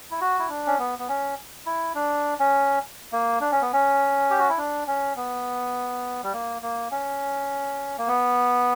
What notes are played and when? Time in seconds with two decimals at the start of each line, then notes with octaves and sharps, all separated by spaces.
0.11 E4
0.21 F#4
0.39 E4
0.49 D4
0.67 C#4
0.79 B3
0.99 B3
1.08 C#4
1.66 E4
1.95 D4
2.39 C#4
3.12 A#3
3.41 D4
3.52 C#4
3.61 B3
3.73 C#4
4.30 G4
4.39 F#4
4.49 E4
4.58 D4
4.87 C#4
5.16 B3
6.23 G3
6.33 A#3
6.62 A#3
6.91 C#4
7.98 A#3
8.08 B3